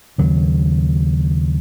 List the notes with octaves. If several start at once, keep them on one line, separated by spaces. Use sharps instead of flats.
D#2 C#3 F#3